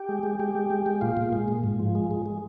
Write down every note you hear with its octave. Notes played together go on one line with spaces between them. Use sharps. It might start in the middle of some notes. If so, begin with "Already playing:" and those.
Already playing: G4
G#3
G#3
G#3 G4
G#3
G#3
G#3
A#2 F4
A#2
G#3
A#2
G#2
F3
G#3
G#3
G#3